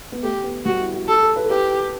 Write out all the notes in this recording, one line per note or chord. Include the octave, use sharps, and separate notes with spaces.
B3
A3 G4
B3
G3 F#4
E4
F#4
G4 A4
A4
B4
A4
G4 B4